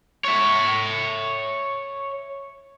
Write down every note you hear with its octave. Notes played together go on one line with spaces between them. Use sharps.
C#5 E5